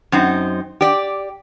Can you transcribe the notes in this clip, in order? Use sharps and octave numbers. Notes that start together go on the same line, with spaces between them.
F#2 C4 D#4
G4 D5